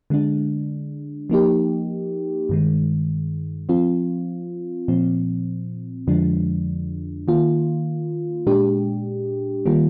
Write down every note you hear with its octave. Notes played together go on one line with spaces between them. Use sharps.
D3 G#3 D4
F3 A#3 D#4 G4
G2 D#3 G#3
F3 C4 F4
A#2 F3 C4
F2 D3 F3 G#3 D4
D#3 A#3 F4
A#2 G#3 D4 G4
D#3 G3 A#3 F4